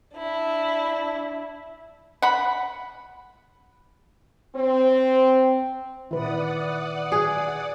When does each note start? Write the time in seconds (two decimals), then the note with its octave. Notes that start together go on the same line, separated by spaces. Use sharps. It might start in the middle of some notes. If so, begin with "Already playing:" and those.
0.16 D4 E4
2.22 F#5 B5
4.55 C4
6.11 A#2 D#3 E4 B4 D5 F#5 D#6
7.12 G#4